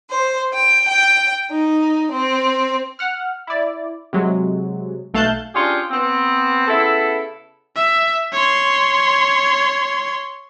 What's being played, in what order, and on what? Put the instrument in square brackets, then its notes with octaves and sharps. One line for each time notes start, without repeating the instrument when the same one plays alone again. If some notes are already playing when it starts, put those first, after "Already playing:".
[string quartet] C5
G5
G5
D#4
C4
[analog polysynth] F#5 F6
E4 D5
C3 F#3 G#3
B1 A3 F5 A5 F#6 G6
[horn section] C#4 D4 F4 G4 G#4
B3 C4
C#3 B3 E4 A4
[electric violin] E5
C#5 C6